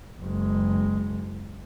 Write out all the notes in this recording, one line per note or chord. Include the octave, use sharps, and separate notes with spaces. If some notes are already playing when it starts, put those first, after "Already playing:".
F#1 G#3